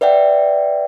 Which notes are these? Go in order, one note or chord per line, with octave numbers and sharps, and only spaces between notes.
B4 D5 E5 F#5 G5